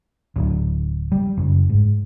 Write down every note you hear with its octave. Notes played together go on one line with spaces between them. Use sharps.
D1
G3
F#1
G#2